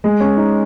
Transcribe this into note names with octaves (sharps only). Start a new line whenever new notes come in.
G#3
C#4
D#4